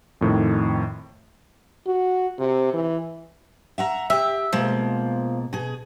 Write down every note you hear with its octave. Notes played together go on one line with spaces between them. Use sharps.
F2 A2 D#3
F#4
C3
E3
E5 F#5 A#5
G4 E5
B2 F3 G#3 A#3
B2 G#4